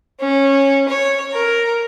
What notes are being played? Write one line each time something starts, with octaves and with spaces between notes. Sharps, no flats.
C#4
C#5
A#4